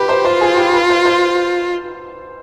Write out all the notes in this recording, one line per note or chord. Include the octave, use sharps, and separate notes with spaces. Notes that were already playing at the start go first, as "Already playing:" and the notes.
Already playing: G4 B4 B5
C5 C6
F4 C5 C6
G#4 G#5
G4 G5
B4 B5
C5 C6
C5 C6